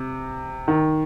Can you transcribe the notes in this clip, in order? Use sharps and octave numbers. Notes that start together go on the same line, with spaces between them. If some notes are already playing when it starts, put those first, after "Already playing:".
Already playing: C3
D#3